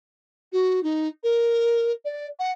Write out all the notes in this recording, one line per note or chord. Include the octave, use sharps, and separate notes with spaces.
F#4
D#4
A#4
D5
F#5